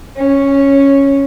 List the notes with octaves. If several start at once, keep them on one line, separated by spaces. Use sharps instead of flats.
C#4